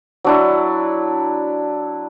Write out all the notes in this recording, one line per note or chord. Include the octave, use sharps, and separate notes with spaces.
F#3 D4 E4